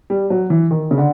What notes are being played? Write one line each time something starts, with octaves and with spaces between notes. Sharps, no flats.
G3
F#3
E3
D#3
C#3
D3